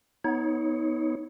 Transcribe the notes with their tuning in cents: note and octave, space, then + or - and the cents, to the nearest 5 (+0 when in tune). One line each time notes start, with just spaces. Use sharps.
B3 +0 D#4 +25 C#5 +0